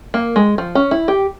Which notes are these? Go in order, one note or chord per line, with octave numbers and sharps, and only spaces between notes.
A#3
G#3
F3
C#4
E4
G4